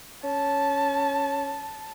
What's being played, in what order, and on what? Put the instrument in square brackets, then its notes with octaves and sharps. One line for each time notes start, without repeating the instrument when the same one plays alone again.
[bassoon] C#4 [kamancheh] A5